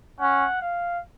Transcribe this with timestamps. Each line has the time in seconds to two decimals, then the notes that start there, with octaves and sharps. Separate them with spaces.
0.20 C#4 F#5
0.62 F5